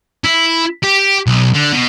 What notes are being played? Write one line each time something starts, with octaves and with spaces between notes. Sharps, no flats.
E4
G4
B1
D3
B2